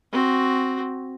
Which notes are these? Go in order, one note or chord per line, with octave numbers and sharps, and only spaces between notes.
C4 F#4